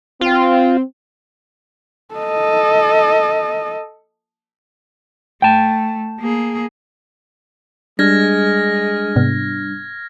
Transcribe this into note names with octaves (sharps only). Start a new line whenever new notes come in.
C4 F4
A4 D#5
A3 G5 A5
A#3 G#4
G3 G#3 D4 F6 G#6 A#6
G#2 C3 B3